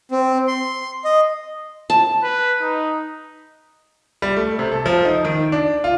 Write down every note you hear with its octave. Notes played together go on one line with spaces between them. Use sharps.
C4
C6
D#5
A5
B4
D#4
G3
A3
C3
A4
F3
D#4
D#3
D4
F4